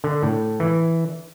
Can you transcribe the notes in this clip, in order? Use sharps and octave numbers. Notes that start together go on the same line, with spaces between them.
D3
A2
E3